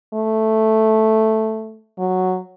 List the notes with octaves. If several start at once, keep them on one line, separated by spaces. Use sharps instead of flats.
A3
F#3